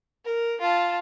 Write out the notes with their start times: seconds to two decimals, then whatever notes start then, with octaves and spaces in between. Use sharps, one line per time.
0.25 A#4
0.60 F4 A5